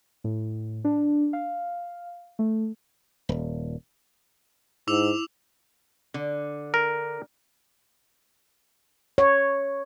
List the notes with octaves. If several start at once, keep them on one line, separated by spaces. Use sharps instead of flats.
A2
D4
F5
A3
D#1
G#2 E4 D6 E6 F7
D3
A#4
C#5